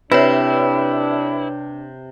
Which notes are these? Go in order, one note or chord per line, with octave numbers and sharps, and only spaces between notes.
C3 D4 E4 B4 C#5